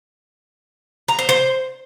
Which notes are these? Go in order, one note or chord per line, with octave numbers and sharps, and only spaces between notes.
A#5
C5
C5